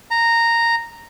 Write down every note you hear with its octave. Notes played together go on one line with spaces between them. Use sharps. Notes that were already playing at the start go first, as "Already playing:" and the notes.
A#5